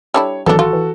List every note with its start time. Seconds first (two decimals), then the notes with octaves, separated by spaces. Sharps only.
0.14 G3 D4 E4 A4 C#5
0.46 A1 D#3 E3 F#3 B3 D4 A4
0.59 F4 F#4 A4
0.73 E3